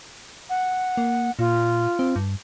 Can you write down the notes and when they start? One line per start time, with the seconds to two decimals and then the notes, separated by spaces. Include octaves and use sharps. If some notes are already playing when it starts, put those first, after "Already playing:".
0.50 F#5
0.97 A#3
1.39 A#2 F4
1.99 C4
2.16 G2